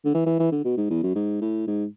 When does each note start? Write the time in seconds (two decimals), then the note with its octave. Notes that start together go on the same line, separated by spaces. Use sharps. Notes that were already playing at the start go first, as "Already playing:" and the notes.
0.05 D3
0.14 E3
0.26 E3
0.39 E3
0.52 D3
0.64 B2
0.77 G#2
0.90 E2
1.03 F#2
1.15 G#2
1.41 A2
1.67 G#2